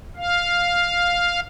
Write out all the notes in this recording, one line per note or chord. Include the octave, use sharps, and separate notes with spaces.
F5